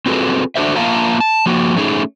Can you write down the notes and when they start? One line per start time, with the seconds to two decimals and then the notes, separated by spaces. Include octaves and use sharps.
0.06 C4 F4 F#4 G#4 A4 B4
0.56 D4 F#4 A4 C5 E5
0.76 A#3 F4 E5 F5 A5 A#5
1.20 A5
1.46 F3 A#3 F#4
1.77 A3 C#4 D#4 G#4